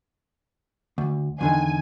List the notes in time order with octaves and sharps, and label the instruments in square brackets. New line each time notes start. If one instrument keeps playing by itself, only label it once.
[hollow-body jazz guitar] D2
[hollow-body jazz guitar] E2 D3 D#3 [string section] G#5